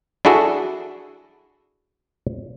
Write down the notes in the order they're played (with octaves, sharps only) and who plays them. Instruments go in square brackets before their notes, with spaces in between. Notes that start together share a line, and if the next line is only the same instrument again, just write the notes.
[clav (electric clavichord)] D4 E4 F#4 G#4 A4